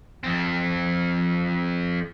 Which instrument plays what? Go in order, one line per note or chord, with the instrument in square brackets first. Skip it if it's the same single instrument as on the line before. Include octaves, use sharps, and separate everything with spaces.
[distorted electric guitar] F2 C4